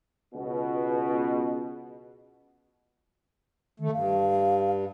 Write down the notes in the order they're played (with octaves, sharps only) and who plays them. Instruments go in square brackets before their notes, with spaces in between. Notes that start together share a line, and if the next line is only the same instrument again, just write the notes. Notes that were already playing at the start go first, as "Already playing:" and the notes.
[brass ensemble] C#2 B2
[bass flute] D#3 [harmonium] A3
[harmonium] G2 [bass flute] F5